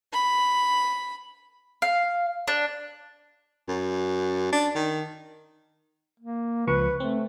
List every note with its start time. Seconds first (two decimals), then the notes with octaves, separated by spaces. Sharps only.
0.13 B5
1.82 F5
2.48 D4
3.68 F#2
4.53 D4
4.75 D#3
6.20 A#3
6.67 C#2 F3 B4 C#6
7.00 A3 C4